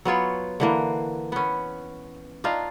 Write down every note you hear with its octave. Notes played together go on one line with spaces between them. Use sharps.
F#3 B3 F4 C#5
D3 E3 A#3
B3 C#4
D4 D#4 F4 F5